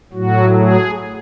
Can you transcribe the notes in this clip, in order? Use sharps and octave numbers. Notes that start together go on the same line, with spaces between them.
A2 F#3 F#4
G#4